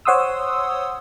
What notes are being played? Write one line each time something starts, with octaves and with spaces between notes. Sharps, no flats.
C5 C#5 F#5 C6 D#6 E6